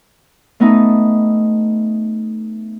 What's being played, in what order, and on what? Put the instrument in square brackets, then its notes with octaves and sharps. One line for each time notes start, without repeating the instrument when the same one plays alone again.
[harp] A3 B3 D#4